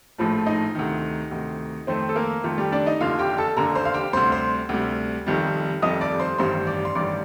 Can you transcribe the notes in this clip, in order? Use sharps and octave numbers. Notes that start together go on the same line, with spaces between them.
A#1 A2 F3 A3
D#4 D#5
D2 C3 D#3
D2 C3 D#3
F2 D#3 A3 C4 C5
A4
A#3 A#4
F2 D#3 A3 F4
G3 G4
D4 D5
D#4 D#5
F1 D#2 D3 F4 F5
G4 G5
A4 A5
F1 D#2 D3 A#4 A#5
C5 C6
F5
G4 G5
D2 C3 G3 C5 C6
C5 C6
D2 C3 G3
F1 F2 D#3 G3
F1 F2 D#3 G3 D#5 D#6
D5 D6
C5 C6
A1 G2 D#3 G3 C5 C6
D5 D6
C6
A1 G2 D#3 G3 D5 D6